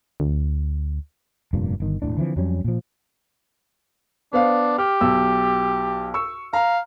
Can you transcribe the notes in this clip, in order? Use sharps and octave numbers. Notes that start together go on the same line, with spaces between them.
D2
F1 G2 A#2
G1 D#3
E1 A#1 A2 D4
D3 E3 F3 C4
F2 F#3 G3 C#4
A#2 F3
B3 D4 C5 F5
G4 F6
B1 E6
C#6 E6
F5 A#5